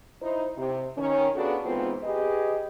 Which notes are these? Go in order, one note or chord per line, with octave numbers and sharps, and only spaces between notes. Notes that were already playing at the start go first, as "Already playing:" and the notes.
D#4 E4 C5
C3
D#3 C#4
B3 D4 F4 F#4 G#4 A4
G#2 E3 B3 C4 F4 B4
G4 G#4 B4 D#5